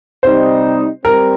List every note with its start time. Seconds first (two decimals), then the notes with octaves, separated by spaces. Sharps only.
0.23 C3 G3 C4 D#4 C5
1.04 G3 C4 A#4